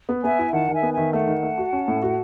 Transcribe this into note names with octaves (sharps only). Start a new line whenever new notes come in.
B3
B3 E5 G#5
E4
D#3 F#5 A5
D#3
E5 G#5
B3
D#3 E5 G#5
A3 F#5 A5
D#3
A3
F#4
C#4
A2
F#4